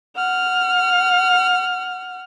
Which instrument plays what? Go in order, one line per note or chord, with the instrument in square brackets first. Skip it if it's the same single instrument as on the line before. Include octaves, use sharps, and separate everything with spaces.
[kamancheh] F#5 F6